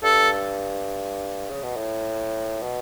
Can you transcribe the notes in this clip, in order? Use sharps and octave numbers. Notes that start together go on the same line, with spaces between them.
G2 A4
C#3
B2
A2
B2